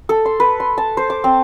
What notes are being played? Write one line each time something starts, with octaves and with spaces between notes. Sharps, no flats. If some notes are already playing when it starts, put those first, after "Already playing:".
A4
C6
B4
C6
A5
C5
D6
C4